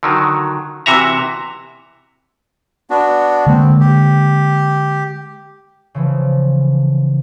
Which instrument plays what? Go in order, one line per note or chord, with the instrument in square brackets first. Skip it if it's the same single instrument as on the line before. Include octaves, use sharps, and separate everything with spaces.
[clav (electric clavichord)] D3 D#3 F#3
C3 E3 F#4 E5 A#5
[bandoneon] B3 D4 F#4
[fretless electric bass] D3 G#3 A#3 [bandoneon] C4
[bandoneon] G4
[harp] C#3 E3 F3